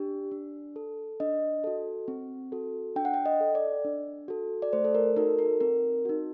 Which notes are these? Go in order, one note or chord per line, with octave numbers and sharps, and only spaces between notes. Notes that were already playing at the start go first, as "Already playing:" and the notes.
Already playing: D4 G4
D4
A4
D4 D#5
F#4 A4
C4
F#4 A4
D4 G5
F#5
G5
D#5
A4
D5
D4
F#4 A4
D5
A3 C5
A4
A#4
D#4 F#4 A4 A#4
A#4
C4 A#4
D#4 F#4